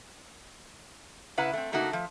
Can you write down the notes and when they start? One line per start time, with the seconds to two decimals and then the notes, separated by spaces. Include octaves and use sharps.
1.37 C#3 E4 B4 F#5 A#5
1.53 A3 C4
1.72 C#3 A3 A#3 D#4 F#4
1.91 F3 A3